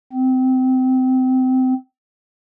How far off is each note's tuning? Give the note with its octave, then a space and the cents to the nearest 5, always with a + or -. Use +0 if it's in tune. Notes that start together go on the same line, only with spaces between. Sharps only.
C4 -20